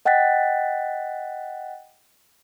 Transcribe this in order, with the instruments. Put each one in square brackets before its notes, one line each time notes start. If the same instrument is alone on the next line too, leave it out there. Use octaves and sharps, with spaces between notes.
[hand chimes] D#5 F#5 G5 F#6 A6 B6